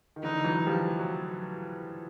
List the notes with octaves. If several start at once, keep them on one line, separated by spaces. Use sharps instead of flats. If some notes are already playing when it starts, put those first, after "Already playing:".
D#3
D3 E3 D#4
E3 F#3
F3 G3
F#3